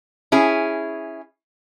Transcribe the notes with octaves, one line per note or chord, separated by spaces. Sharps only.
C#4 E4 G#4